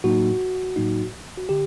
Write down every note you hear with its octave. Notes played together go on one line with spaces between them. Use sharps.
A2 F#3 A#3 D#4 F#4
A2 F#3 A#3 D#4
F#4
D3 G4